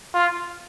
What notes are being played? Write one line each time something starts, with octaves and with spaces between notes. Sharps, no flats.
F4